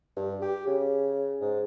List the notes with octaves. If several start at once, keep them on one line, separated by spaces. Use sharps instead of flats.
G2
G4
C#3
G#2